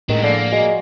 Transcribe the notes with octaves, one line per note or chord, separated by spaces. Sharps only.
A2 D#3 G#3 D4 G#4
D3 F3 A#3 D5 F5
G#3 F#4